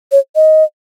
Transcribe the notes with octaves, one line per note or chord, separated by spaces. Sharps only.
C#5
D#5